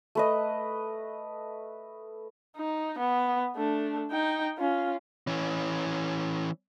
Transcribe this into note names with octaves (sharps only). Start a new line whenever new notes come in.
A3 B4 D#5
D#4
B3
A3 D4
D#4 G5
C#4 F4
E3 C#4